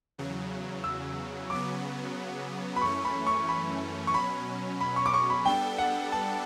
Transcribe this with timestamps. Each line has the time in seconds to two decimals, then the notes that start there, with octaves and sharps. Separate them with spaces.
0.18 E2 C#3 F#3
0.84 E6
1.50 C#3 F#3 B3 D6
2.76 B5
2.82 F#2 E3 A3 C#4 C#6
3.05 B5
3.27 C#6
3.49 B5
4.07 C#6
4.14 B2 F#3 C#4 B5
4.81 B5
4.96 C#6
5.06 D6
5.14 C#6
5.30 B5
5.45 G3 B3 D4 A4 G5
5.78 F#5
6.12 A5